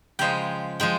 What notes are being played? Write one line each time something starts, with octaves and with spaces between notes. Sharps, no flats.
C#3 F3 G#3 G5
F3 G#3 G5